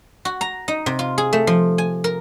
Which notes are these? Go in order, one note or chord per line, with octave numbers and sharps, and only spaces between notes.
F#4
A#5
D#4
C3
F4
G#4
A3
F3
G#5
A#4